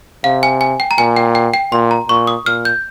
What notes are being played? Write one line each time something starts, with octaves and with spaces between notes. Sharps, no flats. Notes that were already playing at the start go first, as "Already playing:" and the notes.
C3 F5
G#5
G#5
G5
A#5
A#2 G#5
G5
G5
G5
A#2 C6
A#5
A#2 C#6
D#6
A#2 F6
G6